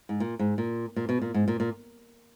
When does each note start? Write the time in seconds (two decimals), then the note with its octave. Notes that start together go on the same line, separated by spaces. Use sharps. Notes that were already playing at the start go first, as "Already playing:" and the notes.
0.09 G#2
0.20 A#2
0.39 G#2
0.58 A#2
0.96 A#2
1.09 B2
1.22 A#2
1.34 G#2
1.48 A#2
1.60 A#2